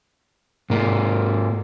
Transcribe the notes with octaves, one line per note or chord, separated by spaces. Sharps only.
G#2 A#3